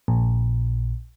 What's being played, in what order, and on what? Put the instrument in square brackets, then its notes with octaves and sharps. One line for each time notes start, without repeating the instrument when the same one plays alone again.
[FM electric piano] A#1